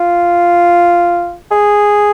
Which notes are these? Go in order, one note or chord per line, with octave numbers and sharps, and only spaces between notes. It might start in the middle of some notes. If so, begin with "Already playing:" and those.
Already playing: F4
G#4